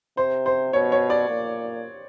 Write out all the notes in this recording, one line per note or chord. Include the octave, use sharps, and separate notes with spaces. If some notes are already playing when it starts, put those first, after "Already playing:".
C3 C5
C5
B2 C#5
C#5
D5
A#2